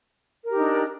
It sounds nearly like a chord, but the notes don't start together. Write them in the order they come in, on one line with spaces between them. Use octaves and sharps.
A#4 G4 D#4 D4